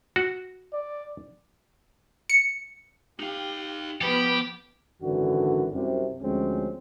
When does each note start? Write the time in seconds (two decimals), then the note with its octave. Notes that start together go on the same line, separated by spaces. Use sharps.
0.16 F#4
0.73 D5
2.30 C#7
3.19 D#4 G4 F5
4.01 F3 B3 G4 B4
5.03 G#1 F#2 D3 E3 D4 F#4
5.73 C2 F#2 C3
6.22 D2 F3 G#3 C4 C#4